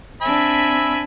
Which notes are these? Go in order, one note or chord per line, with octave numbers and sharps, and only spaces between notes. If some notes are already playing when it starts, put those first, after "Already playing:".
C4 D4 E5 G#5 B5